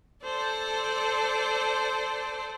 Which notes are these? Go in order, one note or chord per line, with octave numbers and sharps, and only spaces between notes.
A4 C5 D5 A5